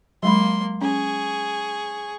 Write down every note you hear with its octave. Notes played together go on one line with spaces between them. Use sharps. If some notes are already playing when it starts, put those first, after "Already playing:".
F#3 G#3 A#3 B5 C6
C#4 G#4 C#6